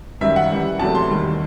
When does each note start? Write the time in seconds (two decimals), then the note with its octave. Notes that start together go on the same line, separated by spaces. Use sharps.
0.21 F#2 D#3 G3 E5
0.36 F#5
0.51 F#2 E3 G3
0.79 E2 C3 F#3 A3 A5
0.95 C6
1.09 D#2 D#3 G3